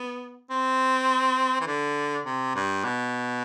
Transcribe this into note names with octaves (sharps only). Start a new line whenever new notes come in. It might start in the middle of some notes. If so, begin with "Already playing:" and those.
Already playing: B3
C4
E3
D3
C3
G2
B2